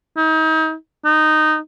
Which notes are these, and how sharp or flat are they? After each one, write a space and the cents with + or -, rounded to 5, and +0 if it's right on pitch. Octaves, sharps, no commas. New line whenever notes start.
D#4 +35
D#4 -10